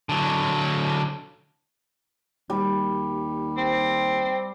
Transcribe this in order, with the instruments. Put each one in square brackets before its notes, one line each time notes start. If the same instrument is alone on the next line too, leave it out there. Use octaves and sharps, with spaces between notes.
[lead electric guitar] D3 F#3
[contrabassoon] D#2 [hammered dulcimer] G3
[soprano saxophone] C4